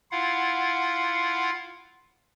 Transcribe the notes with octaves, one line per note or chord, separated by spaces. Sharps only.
E4 F4 F5 F#5